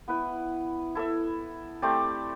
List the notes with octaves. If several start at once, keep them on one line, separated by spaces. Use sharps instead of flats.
B3 E4 B4
E4 A4 E5
A3 C4 G4 D5